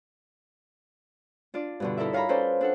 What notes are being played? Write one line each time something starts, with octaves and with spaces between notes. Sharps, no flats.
D4 F4 D5
G2 B2 D3
D#4 E4 A4 A#4 D5 E5
C#5 F5 G#5 A#5 B5
C#4 A4 B4 C5 D5
D4 A4 F#5